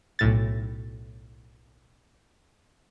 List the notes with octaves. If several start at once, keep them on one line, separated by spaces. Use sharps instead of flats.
B1 A2 A6